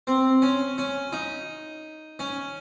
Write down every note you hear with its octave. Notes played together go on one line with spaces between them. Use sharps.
C4
C#4
C#4
D#4
C#4